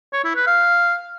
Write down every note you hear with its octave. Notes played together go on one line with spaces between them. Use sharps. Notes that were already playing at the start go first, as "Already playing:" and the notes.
C#5
E4
B4
F5